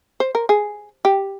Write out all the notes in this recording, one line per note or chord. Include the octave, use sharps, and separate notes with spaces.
C5
A#4
G#4
G4